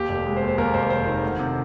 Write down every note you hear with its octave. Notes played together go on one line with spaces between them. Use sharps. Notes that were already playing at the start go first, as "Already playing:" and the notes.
Already playing: D#2 G4
F1
G#3
C5
D#2
C5
D#2 A#4
F1 C5
F1 C5
D#3
D2
C3